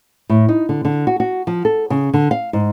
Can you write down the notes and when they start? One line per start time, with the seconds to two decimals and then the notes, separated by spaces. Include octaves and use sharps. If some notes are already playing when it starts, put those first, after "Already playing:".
0.30 A2
0.49 D#4
0.69 D3
0.85 D3
1.07 F#4
1.20 F#4
1.47 F3
1.65 A4
1.90 C#3
2.14 D3
2.31 F5
2.53 G#2